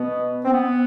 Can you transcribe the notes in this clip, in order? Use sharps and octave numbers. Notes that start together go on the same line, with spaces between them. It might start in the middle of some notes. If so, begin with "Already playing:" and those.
Already playing: B2 B3
C4
B3